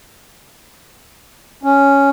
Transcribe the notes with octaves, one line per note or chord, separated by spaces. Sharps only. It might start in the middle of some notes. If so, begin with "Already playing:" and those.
C#4